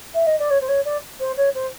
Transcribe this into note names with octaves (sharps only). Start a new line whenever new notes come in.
E5
D#5
D5
C#5
C5
C#5
D5
C5
C#5
C5